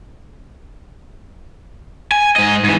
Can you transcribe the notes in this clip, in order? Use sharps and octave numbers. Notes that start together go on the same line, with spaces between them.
G#5
G#2 D#5
G#2 E3